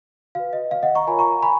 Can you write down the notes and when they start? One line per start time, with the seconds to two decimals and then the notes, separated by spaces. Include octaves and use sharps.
0.35 F#4 B4 F5
0.53 D#5
0.71 F5
0.83 D#5 F#5
0.95 A#5 C#6
1.07 F4 A#4 C#5 G#5 B5
1.19 A#5 C#6
1.43 G#5 B5